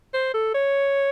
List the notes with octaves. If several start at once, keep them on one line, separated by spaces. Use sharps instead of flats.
C5
A4
C#5